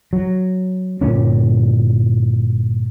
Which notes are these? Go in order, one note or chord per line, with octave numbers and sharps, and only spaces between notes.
F#3
G2 A#2 D3 C#4